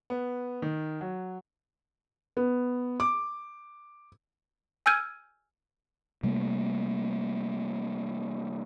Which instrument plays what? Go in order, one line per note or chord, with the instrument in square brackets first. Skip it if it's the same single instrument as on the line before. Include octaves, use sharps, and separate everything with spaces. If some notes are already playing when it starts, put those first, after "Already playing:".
[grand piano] B3
D#3
F#3
[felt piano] B3
D6
[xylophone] G#5 E6 F6 G6 G#6 D#7
[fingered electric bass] C3 G3 A3 A#3